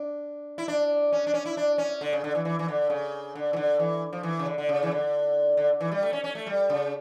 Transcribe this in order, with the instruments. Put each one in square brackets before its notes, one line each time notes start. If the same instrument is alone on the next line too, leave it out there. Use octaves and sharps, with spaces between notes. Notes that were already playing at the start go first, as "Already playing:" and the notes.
Already playing: [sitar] D4
E4
D4
C#4
D4
C#4
E4
D4
C#4
D3
C#3
D3
E3
E3
E3
D3
C#3
D3
E3
D3
E3
F3
E3
C#3
D3
D3
C#3
E3
D3
D3
E3
G3
A3
C#4
C#4
A3
G3
C#3